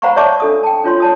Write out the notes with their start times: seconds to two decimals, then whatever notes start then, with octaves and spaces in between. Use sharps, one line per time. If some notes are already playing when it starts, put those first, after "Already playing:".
0.02 C5 F5 F#5 A#5 B5 C#6
0.16 C#5 D5 E5 A5 C#6 D6
0.40 D4 A4 D#6
0.63 G5 A5
0.84 D4 F4 C#5 C6
1.00 C#5 A5 D#6